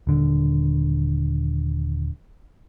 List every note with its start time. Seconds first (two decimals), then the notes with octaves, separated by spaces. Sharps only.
0.07 D#1 D3